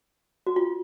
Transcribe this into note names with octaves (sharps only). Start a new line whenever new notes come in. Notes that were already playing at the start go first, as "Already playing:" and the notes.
F#4
F4